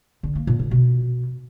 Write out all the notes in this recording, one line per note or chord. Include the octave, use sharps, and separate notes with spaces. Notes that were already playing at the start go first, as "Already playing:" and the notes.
D3
A#3
A#2
D3
B2